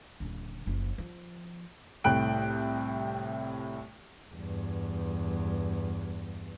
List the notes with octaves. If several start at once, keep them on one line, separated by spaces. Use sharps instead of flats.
D#1 D3
F#1 F3
F3
C2 A2 G5 F#6 D7
E2 G2